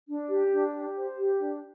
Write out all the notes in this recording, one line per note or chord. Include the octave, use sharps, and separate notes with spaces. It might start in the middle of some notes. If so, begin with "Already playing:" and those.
D4
G4
D4
G4
C5
G4
D4